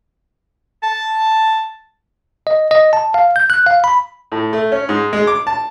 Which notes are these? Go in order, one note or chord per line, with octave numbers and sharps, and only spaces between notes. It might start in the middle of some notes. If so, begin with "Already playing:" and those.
A5
D#5
D#5
A5
F5
G6
F#6
F5
B5
A2
A3
C#4
G#2
G#3
D6
A5